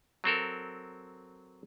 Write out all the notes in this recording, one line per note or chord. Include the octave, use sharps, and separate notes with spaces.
F#3 C4 A4 A#4